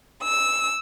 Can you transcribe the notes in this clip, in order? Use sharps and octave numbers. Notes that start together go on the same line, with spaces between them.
E6